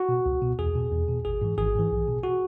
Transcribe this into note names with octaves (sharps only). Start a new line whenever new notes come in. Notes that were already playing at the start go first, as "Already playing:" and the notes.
Already playing: F#4
B2
C#2
B2
E2 G#4
B2
E2
B2
G#1 G#4
G#2 E3
G#1 G#4
G#2 E3
B1
B2
F#4